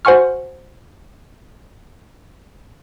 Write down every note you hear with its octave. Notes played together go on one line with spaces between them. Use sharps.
F#4 C5 F#5 G#5 C#6 F6